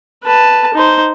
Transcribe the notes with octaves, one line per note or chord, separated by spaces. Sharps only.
B4 A5
D#4 C5